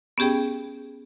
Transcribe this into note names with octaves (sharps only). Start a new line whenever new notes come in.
B3 C#4 G4 G#4 G5